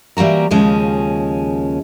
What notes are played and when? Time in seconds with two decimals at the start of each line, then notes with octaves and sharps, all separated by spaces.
0.17 E3 G3 A#3 F#4 A#5
0.51 D#2 C#3 F3 G#3 C#4